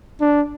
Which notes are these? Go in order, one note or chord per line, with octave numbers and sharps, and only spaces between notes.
D4